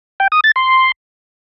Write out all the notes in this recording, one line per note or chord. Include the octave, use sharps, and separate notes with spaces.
G5
D#6
A6
C6